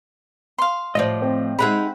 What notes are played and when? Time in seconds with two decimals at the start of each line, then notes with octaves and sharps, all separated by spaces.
0.58 F5 C6
0.95 A2 F3 C5 D5 D#5
1.22 C4
1.59 G#3 D#4 G#4 E5 F#5 B5